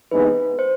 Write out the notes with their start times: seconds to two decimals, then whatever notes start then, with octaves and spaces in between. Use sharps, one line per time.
0.11 C3 E3 G#3 B3 D#4 B4
0.59 C5